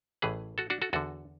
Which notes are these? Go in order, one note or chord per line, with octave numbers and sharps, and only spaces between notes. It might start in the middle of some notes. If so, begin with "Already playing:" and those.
A1 A2 E3 G#4 B4
F#4 A4
D4 F#4
F#4 A4
E2 D3 F#4 A4